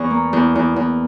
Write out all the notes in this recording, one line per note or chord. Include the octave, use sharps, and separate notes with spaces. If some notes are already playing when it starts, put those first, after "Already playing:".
Already playing: E2 C#6
A#3
E2
E2
E2